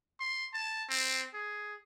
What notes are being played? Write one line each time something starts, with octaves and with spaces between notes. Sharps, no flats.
C6
A5
C4
G#4